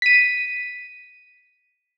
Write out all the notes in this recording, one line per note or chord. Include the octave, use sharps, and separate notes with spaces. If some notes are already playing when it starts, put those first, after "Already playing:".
B6 D#7